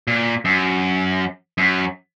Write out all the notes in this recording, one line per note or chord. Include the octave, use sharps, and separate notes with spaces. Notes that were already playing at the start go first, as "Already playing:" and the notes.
A#2
F#2
F#2